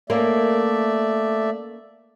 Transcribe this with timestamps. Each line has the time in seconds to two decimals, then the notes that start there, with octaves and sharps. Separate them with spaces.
0.10 A3 A#3 C#4 A#4 D5 E5